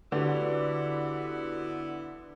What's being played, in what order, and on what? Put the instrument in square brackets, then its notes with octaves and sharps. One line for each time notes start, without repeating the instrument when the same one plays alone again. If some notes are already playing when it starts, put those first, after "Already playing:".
[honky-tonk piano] D3 [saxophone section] B3 E4 [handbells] F#4 G4 B4 [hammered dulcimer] D5